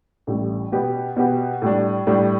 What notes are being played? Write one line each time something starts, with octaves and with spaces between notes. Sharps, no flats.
A1 A2 G3
B2 B3 G4
B2 B3 G4
A2 G3 D4
A2 G3 D4